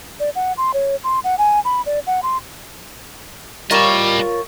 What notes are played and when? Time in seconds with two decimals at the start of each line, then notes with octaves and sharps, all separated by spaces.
0.20 D5
0.35 F#5
0.57 C6
0.74 C#5
1.04 C6
1.24 F#5
1.38 G#5
1.65 B5
1.86 D5
2.07 F#5
2.23 C6
3.71 G3 F4 A#4 C#5 D#5 A5